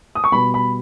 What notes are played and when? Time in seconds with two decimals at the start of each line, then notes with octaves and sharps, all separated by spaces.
0.15 D#6
0.24 C#6
0.32 B2 G3 B3 B5
0.54 B5